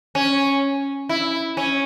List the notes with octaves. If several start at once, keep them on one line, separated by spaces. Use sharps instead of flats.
C#4
E4
C#4